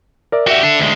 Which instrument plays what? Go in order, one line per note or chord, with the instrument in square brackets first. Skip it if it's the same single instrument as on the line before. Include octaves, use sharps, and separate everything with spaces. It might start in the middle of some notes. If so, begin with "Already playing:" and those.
[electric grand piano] A#4 D5 E5
[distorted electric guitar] F#4 G4 [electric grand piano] D5 E5
[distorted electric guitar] D4 A4
D2 G#3